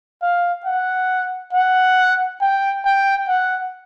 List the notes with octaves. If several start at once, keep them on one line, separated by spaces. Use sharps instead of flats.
F5
F#5
F#5
G5
G5
F#5